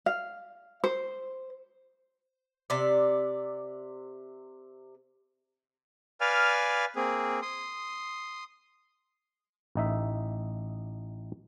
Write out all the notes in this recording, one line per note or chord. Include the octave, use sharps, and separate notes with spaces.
F5
C5
C3 D5
B4 D5 F5 G#5 F6
A#3 C4 G#4
C6 D#6
A1 D#4 E5